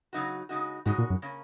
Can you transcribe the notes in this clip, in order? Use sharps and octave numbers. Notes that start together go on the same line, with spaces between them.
C#3 F#3 D#4 F#4
C#3 G#3 D#4 F#4
G#2 C#3 G#3 D#4 F#4
A#2
F#2
C#3 A#3 C#4